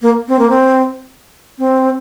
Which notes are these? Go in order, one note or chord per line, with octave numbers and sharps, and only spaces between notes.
A#3
C4
A#3
C4
C4